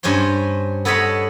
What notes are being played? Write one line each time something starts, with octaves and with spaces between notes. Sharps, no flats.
G2 C#4 C5 C#5 C6
B3 A4 C#5 D#5 B5